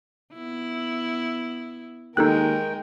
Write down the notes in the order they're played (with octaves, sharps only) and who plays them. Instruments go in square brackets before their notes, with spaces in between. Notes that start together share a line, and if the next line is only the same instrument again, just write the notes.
[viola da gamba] B3 E4
[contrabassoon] D#2 [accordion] D#3 G5 [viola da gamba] G#3 A#4 [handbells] D#4 A4 F#6